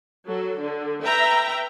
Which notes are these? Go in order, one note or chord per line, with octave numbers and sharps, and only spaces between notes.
F#3 A4
D3
B4 E5 G5 A#5